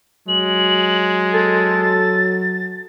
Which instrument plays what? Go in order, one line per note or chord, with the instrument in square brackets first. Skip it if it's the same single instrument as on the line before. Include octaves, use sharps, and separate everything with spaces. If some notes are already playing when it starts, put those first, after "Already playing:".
[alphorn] F#3 [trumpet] G#3 [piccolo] F#7
[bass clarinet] A4 [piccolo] A6